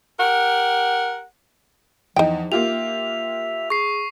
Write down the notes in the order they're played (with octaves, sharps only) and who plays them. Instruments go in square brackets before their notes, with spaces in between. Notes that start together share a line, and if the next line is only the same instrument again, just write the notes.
[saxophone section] G4 A#4 F#5
[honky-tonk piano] E2 [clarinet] F3 [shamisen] D#4 G5
[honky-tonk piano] A#3 F4 G4 [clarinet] E5 [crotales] F7
[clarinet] G#4 [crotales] C#6 C7